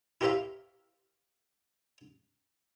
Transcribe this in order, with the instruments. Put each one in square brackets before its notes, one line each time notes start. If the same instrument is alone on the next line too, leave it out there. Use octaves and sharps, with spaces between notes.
[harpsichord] E4 G4 A#4 C5 E5 F5